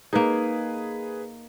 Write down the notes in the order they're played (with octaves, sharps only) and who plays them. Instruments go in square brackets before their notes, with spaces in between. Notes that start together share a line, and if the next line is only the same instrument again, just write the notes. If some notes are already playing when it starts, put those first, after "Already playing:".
[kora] A#3 D#4 [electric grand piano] G#4 B4